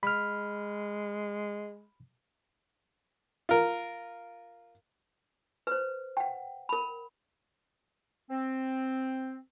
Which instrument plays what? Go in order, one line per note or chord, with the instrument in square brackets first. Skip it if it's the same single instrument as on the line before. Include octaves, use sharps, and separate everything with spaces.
[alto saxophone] G#3 [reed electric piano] B5 F6
[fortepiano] F4 A#4
[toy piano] B4 C5
F#5 G5
A#4 B5
[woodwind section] C4